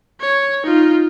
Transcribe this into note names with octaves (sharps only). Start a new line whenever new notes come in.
C#5
D#4 F4